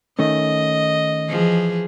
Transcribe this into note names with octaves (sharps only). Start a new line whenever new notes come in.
D#3 A3 C#4 D#5
E3 F3 G#4